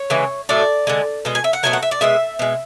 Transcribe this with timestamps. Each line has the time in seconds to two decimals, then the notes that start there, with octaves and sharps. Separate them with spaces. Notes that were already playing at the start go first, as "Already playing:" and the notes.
Already playing: C#5
0.10 C#3 E3 G#3
0.49 A2 F#3 A3 D5
0.87 D3 G#3
1.25 B2 G#3
1.35 G#5
1.44 E5
1.53 F#5
1.63 B2 F#3 A3 G#5
1.73 F#5
1.83 E5
1.91 D5
2.01 B2 G#3 E5
2.39 B2 G#3